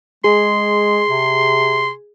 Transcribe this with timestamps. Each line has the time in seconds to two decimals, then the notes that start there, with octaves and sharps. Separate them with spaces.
0.24 G#3 G#4 C6
1.09 C3